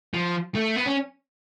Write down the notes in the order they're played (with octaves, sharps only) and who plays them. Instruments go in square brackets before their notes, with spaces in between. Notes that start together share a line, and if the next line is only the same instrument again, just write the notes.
[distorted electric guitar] F3
A3
B3
C#4